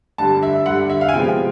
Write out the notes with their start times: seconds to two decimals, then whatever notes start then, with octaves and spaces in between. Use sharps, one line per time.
0.18 G2 D3 G3 A5
0.43 E5
0.65 G2 D3 G3 F#5
0.90 E5
1.01 F5
1.09 G#5
1.13 C3 F3 G#3 B3 G5